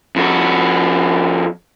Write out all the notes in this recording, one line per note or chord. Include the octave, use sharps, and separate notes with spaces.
F2 F#4